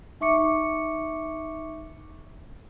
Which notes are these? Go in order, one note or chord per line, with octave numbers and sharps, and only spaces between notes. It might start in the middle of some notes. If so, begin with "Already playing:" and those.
D#4 E5 C#6 D6 C#7